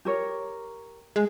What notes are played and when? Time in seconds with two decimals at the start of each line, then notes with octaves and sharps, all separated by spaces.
0.05 G4 A#4 C#5
1.16 G#3